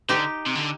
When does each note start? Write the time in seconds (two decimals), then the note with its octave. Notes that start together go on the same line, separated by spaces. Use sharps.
0.09 D3 D#4 G4
0.46 C3
0.55 D3